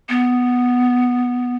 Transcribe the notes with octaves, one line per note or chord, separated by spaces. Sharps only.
B3